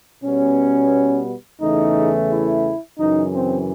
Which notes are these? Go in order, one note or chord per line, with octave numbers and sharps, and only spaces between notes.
B2 G3 B3 C#4
E2 C#3 E3 A3 D#4
E4
F#2 C#3 E3 D#4
C4